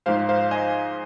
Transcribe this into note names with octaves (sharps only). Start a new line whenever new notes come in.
G#2 F3 G#3 C5 F5
C5 F5
D#5 G#5